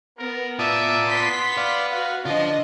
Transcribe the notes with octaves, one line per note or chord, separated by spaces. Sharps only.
B3 A#4
F4 D5 E5 A5 D6 D#6
B3 C6 B6
B4 D5 F5
F#4 F5
D3 D4 F4 C5 D#5